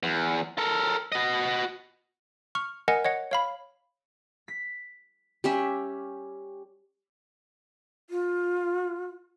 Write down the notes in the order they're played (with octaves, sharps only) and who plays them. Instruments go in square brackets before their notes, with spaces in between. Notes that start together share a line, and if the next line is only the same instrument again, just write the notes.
[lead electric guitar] E2
A4 A#4
F#4 D#5
[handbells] C#6 F6
A#4 D#5 F#5 G#5
C#5 D#5 F#5
C#5 F5 B5
[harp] B6
[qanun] G3 C#4 E5 [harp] G4
[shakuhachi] F4